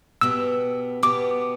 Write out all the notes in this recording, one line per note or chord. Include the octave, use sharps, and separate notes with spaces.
B2 B3 G4 E6
B2 B3 G4 D6